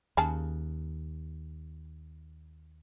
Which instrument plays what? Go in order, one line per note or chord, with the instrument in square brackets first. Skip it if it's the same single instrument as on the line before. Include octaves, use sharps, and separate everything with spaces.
[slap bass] D#2 [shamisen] C#3 G#4 A5